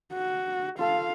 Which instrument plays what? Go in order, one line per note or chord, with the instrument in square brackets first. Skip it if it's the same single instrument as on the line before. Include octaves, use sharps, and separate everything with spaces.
[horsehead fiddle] F#4
[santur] F4 A4 [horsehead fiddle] F5